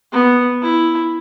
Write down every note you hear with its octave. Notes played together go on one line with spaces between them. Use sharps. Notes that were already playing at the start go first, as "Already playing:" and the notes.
B3
E4